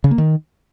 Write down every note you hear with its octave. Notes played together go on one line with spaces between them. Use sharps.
C#3
A#3
D#3